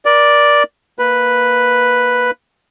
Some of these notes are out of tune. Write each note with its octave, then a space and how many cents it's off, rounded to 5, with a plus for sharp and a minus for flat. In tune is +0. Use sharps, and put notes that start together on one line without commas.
A#4 +30 D5 +0
A#3 +0 B4 +0